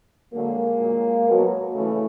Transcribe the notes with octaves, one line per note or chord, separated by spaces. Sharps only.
D3 F#3 G#3 A#3
A#2 F#3
B2 F#3
C#3 E3 A3